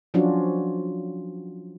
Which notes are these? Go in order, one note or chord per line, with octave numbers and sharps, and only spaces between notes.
F3 F#3 C#4 D4 F4 F#4